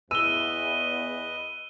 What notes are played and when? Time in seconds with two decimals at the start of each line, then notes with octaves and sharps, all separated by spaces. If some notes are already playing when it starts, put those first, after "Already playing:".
0.11 E2 B4 D#5 E6 D#7 G7